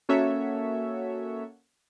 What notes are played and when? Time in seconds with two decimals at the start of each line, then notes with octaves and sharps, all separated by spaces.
0.09 A#3 C#4 F#4 A4 C#5 E5